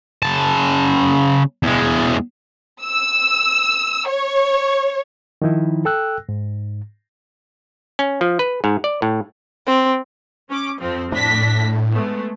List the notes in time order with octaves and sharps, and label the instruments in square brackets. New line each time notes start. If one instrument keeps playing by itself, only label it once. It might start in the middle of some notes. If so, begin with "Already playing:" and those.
[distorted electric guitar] C#3 A5
E2 G#3
[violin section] E6
C#5
[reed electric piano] D#3 F3 D#4 E4
A4 G5 E6 F#6
G#2
[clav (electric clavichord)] C#4
F3
B4
G#2
D5
A2
[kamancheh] C4
[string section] C#4 D6
F2 F3 C4
[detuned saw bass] A2 [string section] D4 A#6 B6
[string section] G#3 A3 B3